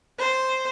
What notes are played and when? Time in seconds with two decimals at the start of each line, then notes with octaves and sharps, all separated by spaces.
0.18 C5